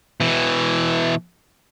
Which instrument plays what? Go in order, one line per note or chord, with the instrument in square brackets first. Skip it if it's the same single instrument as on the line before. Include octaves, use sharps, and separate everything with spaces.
[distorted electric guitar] B2 E3